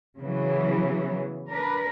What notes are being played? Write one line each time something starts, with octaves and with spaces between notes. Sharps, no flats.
C#3 E3 F#3 B3
D4 A#4 B4